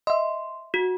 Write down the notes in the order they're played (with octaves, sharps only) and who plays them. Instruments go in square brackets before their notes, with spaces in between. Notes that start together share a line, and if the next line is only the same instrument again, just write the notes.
[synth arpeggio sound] D#5 E5 [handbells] C6
[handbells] F#4